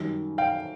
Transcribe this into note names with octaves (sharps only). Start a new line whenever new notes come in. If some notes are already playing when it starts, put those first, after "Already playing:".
Already playing: F#2 D#3 G3
F5 G5